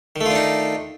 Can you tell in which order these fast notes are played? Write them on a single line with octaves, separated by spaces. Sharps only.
D#3 A3 F4 D4 D#4